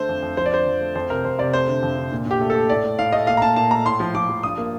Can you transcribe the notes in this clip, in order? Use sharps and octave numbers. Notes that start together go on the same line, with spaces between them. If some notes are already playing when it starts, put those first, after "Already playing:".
Already playing: D3 A3 C5
F2
F2
F3 C5
D5
D3 C5
F2
A3
F2 C5
C3 A#4
F2 C5
C3 D5
A3 C5
D3
F2
D3
A#2
A#2 G4
A3
A4
A3
A2 D5
A3
A2 F5
A3 D#5
A#2 F5
A#5
A#2 A5
A#2 A5
A3 A#5
A2 C6
F3
F3 D6
F3
G2 D#6
A#3